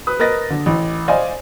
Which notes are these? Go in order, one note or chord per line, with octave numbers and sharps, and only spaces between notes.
B4 D#6
A#4 B4 D#5 A6 A#6
D3
A1
C5 D5 D#5 F5 G#5